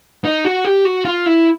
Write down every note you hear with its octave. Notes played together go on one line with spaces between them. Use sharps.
D#4
F#4
G4
F#4
F4
E4